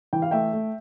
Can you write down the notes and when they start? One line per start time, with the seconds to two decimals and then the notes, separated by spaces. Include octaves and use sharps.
0.13 E3 G5
0.22 F5
0.31 A3 E5 G5
0.53 A3